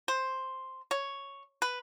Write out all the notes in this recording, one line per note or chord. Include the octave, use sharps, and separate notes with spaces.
C5
C#5
B4